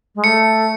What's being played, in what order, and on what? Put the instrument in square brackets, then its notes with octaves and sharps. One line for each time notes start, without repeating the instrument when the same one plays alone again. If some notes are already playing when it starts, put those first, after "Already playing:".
[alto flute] G#3
[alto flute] A3 [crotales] C#7